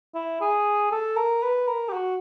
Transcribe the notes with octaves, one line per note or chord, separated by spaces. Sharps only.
E4
G#4
A4
A#4
B4
A#4
G4
F#4